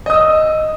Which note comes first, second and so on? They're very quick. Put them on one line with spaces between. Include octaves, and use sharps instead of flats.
D#5 D#6 E6